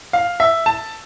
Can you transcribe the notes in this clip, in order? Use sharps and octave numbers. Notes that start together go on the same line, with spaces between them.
F5
E5
A5